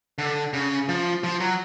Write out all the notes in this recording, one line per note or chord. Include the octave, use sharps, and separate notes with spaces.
D3
C#3
F3
F3
F#3